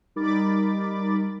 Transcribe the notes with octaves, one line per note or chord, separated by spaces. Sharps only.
G3 D#4 A#4 B5 D6 A6